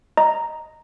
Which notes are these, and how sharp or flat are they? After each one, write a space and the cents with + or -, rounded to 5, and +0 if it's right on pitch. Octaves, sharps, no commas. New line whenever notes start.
D#5 +0 A#5 +0